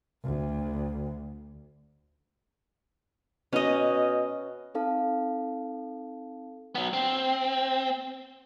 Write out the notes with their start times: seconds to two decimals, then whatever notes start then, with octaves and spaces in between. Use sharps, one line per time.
0.24 D2
3.53 B2 C#4 D#5
4.75 C4 D#4 A4 F5 A5
6.75 F#3 B3
6.93 C4